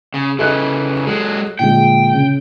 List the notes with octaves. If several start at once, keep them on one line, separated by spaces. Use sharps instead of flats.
C#3
C#3 E3 A4 D#5 F#6
F#3 G#3 A4
A#2 D3 G#3 G5
C#3